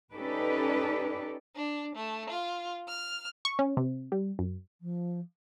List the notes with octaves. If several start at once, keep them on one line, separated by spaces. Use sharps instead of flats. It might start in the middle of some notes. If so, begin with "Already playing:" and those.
C#4 D#4 G4 A4 B4 D5
D4
A3
F4
F6
C#6
C#4
C3
G3
F#2
F3